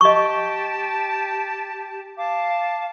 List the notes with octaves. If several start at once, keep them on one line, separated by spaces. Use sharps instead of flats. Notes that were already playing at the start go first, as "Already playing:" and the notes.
G4 D#5 A5 C#6
F5 A5 D6